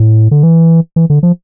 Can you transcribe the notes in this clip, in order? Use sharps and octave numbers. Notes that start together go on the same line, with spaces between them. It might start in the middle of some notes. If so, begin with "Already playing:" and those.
Already playing: A2
D3
E3
E3
D3
F3